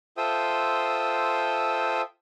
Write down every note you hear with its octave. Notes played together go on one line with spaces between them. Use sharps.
F4 A4 C5 E5 G5 D#6